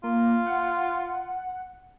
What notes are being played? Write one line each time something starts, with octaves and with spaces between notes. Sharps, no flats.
A#3 F4
F#5